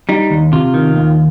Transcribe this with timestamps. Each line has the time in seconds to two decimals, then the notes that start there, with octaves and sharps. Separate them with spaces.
0.09 G3 D#4
0.30 D#2
0.53 C3 F4
0.74 D#3
0.96 D#2